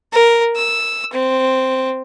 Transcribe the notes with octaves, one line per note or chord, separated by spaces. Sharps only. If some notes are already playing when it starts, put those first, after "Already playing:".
A#4
E6
C4